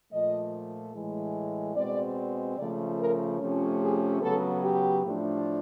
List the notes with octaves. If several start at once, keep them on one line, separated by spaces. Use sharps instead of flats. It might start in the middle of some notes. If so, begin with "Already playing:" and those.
A#2 F3 A3 D#5
A2 E3 G#3
B2 G#3 C4 D5
C#3 F3 A3 D5
A#4
C3 F3 A3 C#4
G#4
C#3 F#3 B3 A4
G4
A2 F3 A3 D4